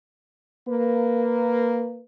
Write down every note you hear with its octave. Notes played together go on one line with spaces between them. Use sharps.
A#3 B4